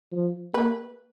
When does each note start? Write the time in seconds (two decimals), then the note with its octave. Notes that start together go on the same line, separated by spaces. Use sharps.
0.12 F3
0.54 A#3 B4